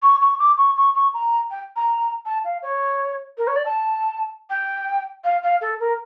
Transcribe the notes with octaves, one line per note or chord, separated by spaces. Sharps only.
C#6
C#6
D6
C#6
C#6
C#6
A#5
G5
A#5
A5
F5
C#5
A#4
C#5
D5
A5
G5
F5
F5
A4
A#4